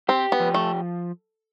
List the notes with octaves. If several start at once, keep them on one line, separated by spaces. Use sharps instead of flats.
C4 G4
B3
F3
A3